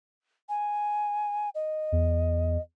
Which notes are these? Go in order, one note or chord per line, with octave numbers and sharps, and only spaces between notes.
G#5
D#5
E2